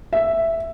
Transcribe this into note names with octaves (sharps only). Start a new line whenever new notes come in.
E5